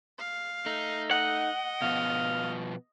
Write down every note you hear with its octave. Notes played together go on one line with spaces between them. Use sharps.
F5
A3 D#4
D#5 F#5
B2 F3 B3 F5